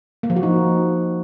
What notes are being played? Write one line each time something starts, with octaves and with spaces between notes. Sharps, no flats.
A#3
F3
F#4
D#4